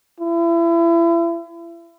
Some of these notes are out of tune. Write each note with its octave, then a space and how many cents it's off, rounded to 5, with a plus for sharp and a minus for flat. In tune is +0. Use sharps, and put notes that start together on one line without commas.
E4 +35